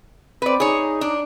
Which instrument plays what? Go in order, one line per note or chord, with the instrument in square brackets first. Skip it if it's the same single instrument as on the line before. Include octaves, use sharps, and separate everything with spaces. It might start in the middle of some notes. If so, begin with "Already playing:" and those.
[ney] C4 [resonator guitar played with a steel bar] B4 D5
[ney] D#4 [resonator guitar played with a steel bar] G#4 C#5
[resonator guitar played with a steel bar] D4